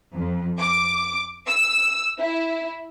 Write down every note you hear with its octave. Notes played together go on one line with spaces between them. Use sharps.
F2
D6
E6
E4